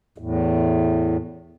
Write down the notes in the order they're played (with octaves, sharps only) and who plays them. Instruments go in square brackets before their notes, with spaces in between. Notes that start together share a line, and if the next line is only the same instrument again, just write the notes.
[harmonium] E2 A2